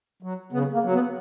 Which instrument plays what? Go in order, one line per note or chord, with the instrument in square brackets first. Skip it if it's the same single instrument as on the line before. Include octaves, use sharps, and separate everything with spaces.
[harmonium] F#3
C#3 B3
A#3
F#3
B3